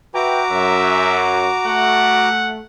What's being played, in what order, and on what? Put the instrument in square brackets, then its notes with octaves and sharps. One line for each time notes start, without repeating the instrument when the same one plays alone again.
[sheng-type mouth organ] F#4 A#5 D6 [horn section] B4 E5 G5
[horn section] F#2 [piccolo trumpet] E5
[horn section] A3 [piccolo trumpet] F#5